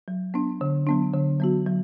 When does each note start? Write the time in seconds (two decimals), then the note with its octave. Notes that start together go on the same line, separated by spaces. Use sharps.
0.08 F#3
0.34 B3 D4
0.61 D3
0.87 F#3 B3 D4
1.13 D3
1.40 F#3 B3 F#4
1.66 F#3